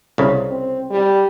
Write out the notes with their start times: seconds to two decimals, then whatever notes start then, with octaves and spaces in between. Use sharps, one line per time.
0.18 C2 C#3
0.49 C4
0.91 G3